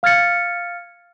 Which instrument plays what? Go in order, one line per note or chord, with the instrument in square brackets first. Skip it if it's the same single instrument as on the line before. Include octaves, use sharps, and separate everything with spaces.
[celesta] F5 F6 G#6 A6 C#7